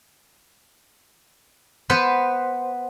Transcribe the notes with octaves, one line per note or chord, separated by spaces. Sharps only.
B3 B4 C5